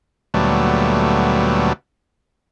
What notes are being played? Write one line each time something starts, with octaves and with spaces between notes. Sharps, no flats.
D2 A#2 F#3 G3 A3 B3